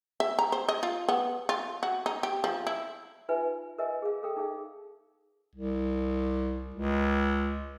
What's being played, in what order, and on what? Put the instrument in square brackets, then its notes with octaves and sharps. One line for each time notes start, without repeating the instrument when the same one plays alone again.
[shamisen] E5
A#5
C5
D#5
F4
B3
F4
F#4
D#4
G4
F3
E4
[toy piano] D#4 F4 B4 E5 F5 G#5
A#4 B4 D#5 E5 G#5
G#4 F5
A4 A#4 F5 G5
D#4 G#4 F5
[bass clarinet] C2
C#2